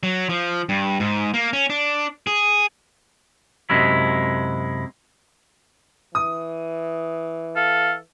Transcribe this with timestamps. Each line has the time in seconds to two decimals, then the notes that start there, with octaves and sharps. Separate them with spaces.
0.03 F#3
0.29 F3
0.69 G2
1.00 G#2
1.34 A#3
1.53 C#4
1.70 D4
2.27 G#4
3.70 F#2 C3 G#3 E4
6.15 E3 D#6
7.56 A4 F5